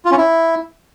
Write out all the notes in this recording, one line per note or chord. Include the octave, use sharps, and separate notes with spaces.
F4
C#4
E4